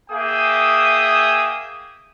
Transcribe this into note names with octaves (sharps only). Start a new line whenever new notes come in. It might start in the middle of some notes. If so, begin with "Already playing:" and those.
A#3 G#4 E5 G5 D#6